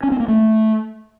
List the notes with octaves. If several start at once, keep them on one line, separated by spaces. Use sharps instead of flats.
C#4
C4
A#3
A3